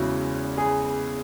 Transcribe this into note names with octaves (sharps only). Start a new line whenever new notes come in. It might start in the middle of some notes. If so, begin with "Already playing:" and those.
Already playing: E2 C#3 G#3 C#4 E4 F#4
G#4